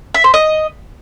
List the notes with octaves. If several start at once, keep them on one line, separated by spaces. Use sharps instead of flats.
E5
C5
D#5